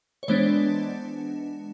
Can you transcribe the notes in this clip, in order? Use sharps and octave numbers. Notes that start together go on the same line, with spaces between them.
C#5
E3 G#3 B3 D4 C5 D5